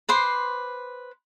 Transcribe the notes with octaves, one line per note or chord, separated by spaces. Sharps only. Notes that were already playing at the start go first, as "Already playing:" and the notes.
B4 C5 C6 D6